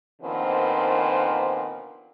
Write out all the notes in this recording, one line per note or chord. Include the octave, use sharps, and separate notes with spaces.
A#2 D3 D#3 F3 B3 C4